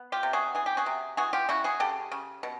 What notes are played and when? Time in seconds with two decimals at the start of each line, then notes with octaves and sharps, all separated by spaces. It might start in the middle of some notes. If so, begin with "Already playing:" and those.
Already playing: B3
0.12 F4 G4
0.23 C3
0.33 F#4 G#4
0.55 E3 G#4
0.66 G4
0.77 F#4 G#4
0.86 C3
1.17 E3 F#4 G#4
1.33 F4 G4
1.49 C#3 E4 F#4
1.64 F#4 G#4
1.80 C#3 G4 A4
2.12 C#3
2.43 B2